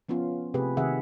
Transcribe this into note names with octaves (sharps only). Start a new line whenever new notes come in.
F3 B3 C#4 F4
C3 A3 G4 G#4 B4
C3 D#3 G#4 E5 F#5